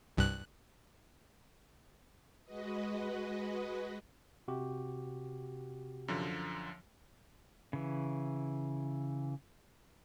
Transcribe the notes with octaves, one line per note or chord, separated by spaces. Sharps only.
C2 G2 F#6
G#3 F#4 B4 D#5
C3 F#4 G4
F#2 D3 F3
C#3 E3